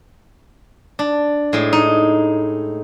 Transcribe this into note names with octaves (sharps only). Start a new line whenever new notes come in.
D4
A2 G#3
D#4